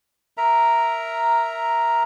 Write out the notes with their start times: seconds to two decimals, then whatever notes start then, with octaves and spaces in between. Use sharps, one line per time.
0.37 A#4 E5 A#5